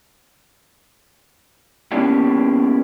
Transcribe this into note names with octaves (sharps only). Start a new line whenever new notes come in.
A#3 B3 C#4 D4 E4 G4